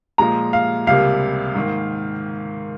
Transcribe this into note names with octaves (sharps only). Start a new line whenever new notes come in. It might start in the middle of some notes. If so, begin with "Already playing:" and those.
A#2 F3 G#3 A#5
F5
C#2 C3 G3 A#3 F5
G#2 D#3 A#3